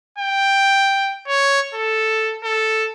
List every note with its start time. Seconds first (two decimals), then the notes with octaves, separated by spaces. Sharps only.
0.18 G5
1.28 C#5
1.75 A4
2.44 A4